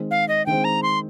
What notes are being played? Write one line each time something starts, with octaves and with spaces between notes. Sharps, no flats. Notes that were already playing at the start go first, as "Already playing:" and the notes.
Already playing: D#3 G#3 C4
F5
D#5
D#3 G#3 C4 G5
A#5
C6